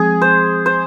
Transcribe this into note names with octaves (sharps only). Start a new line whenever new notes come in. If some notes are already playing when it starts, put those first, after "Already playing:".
Already playing: F3 G#3 C4 G#4
C5
C5